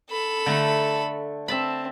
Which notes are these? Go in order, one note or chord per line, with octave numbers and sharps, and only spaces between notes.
A4 B5
D3 A3 A#5
C4 E5 A5 B5